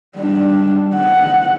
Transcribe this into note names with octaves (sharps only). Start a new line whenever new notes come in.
G3 D4
F#5